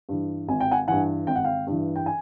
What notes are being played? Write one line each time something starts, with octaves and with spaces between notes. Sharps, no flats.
G2 E3
G#1 G#5
G5
F#5 G#5
G2 E3 F#5 G#5
G#1 G5
F#5
F5 G5
G2 E3
G5
G#5